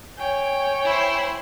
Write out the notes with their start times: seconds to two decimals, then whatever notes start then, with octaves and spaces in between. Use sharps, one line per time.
0.17 C#5 G5 G#5
0.85 E4 C5